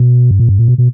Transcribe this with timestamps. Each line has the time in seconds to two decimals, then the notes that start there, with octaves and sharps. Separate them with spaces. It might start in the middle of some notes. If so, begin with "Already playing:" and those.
Already playing: B2
0.31 G2
0.39 A#2
0.49 G2
0.59 A#2
0.68 B2
0.78 B2